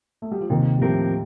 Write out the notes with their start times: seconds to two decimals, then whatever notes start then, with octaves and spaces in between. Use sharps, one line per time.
0.22 A3
0.31 G3
0.41 F3
0.50 D#2 C3 D#3
0.78 G3
0.81 A2 F3 A3 C4 G4 A#4